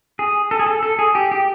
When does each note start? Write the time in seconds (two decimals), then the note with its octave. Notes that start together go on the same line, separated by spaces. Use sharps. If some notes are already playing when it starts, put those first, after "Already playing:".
0.19 G#4
0.51 A4
0.59 G#4
0.66 A4
0.83 A4
0.99 G#4
1.15 G4
1.32 G4